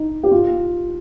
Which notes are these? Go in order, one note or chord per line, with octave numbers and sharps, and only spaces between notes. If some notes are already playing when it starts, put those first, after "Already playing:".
Already playing: D#4
G4
F4